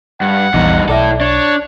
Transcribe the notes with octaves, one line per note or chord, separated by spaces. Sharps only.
G2 F#5
A#1 E2 G2 D#4
B1 E4 A4 D5
D4 C#5